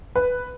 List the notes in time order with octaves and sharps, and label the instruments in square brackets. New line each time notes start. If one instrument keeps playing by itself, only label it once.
[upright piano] B4